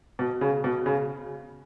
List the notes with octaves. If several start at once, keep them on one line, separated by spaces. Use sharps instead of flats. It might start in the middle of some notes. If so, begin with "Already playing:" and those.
B2
C#3
B2
C#3